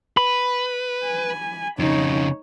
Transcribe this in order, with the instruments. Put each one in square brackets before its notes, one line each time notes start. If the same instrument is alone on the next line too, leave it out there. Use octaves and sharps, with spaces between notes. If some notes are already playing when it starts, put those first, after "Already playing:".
[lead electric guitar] B4 [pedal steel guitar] B5
[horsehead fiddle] G#5
[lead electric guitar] F2 C#3 [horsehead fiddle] D#4 C#5